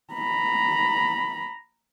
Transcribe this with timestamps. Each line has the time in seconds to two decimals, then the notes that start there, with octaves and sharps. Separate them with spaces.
0.14 A#5 B5